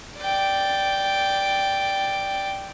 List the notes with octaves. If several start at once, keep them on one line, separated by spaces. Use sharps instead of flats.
D5 G5